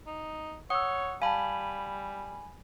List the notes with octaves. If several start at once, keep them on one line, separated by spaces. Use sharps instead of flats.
D#4
C#5 F#5 D#6 E6
G3 F5 G#5 A5 B5